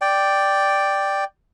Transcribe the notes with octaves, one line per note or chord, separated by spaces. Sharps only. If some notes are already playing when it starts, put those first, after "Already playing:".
D5 G5